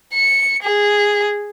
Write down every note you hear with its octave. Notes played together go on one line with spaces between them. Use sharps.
C#7
G#4